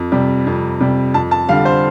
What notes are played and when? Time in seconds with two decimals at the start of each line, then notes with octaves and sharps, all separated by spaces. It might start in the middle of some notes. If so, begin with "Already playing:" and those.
Already playing: F2
0.12 C3 G3
0.47 F2
0.80 C3 G3
1.14 F2 A5
1.31 A5
1.49 D3 G3 F5
1.65 C5